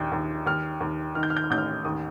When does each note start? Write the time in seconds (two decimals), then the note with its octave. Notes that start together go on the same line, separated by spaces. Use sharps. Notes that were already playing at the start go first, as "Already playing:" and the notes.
Already playing: A#1 D#2 G6
0.12 D#2
0.46 D#2 F6
0.80 D#2
1.15 D#3 F6
1.23 G6
1.30 F6
1.37 G6
1.44 F6
1.50 A1 G6
1.58 F6
1.85 D#2 D#6